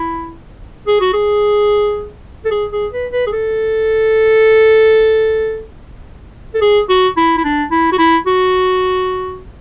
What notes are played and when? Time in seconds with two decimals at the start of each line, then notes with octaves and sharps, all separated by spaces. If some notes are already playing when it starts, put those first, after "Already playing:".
Already playing: E4
0.87 G#4
1.01 F#4
1.14 G#4
2.45 A4
2.51 G#4
2.72 G#4
2.93 B4
3.12 B4
3.27 G#4
3.33 A4
6.54 A4
6.61 G#4
6.89 F#4
7.17 E4
7.37 E4
7.44 D4
7.71 E4
7.92 F#4
7.98 E4
8.27 F#4